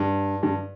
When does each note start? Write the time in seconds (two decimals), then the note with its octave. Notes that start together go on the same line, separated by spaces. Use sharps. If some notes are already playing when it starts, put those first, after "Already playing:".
Already playing: G2
0.43 G2